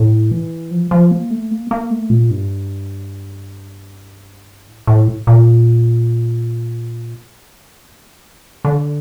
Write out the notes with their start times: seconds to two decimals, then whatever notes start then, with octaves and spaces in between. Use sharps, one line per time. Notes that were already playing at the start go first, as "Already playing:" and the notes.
Already playing: A2
0.31 E3
0.71 F3
0.91 F3
1.11 A#3
1.30 A3
1.51 A#3
1.71 A#3
1.90 A3
2.10 A#2
2.30 G2
4.68 A2
4.87 A2
5.27 A#2
8.65 D3